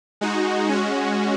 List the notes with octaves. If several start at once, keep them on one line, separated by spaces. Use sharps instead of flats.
G#3 D#4 F#4
G#3 C#4 F#4